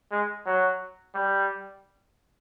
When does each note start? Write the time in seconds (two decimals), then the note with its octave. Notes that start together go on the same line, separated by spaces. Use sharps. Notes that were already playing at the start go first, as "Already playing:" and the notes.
0.11 G#3
0.46 F#3
1.15 G3